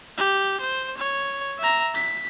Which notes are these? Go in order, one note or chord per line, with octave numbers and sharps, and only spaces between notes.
G4
C5
C#5
E5 A#5
B6